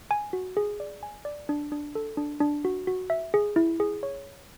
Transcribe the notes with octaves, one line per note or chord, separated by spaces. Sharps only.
G#5
F#4
G#4
D5
G#5
D5
D4
D4
A4
D4
D4
F#4
F#4
E5
G#4
E4
G#4
C#5